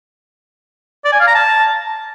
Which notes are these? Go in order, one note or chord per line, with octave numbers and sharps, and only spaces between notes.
D5
G#5
F5
A#5
A5